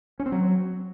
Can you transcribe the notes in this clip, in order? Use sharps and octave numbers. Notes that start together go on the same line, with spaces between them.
C#4
C4
F#3